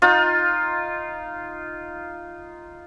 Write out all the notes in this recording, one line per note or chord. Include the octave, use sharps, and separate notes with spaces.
D#4 F4